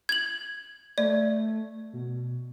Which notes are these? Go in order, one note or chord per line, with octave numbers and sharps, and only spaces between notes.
G#6 F#7
A3 D5
B2